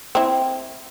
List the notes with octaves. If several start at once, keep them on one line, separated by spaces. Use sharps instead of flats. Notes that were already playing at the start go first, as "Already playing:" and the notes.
C4 E4